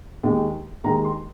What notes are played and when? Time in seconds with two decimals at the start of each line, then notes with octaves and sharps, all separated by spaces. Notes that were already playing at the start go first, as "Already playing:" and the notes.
0.23 D#2 D#3 G#3
0.84 D#2 D#3 G#3 A#5
1.05 C6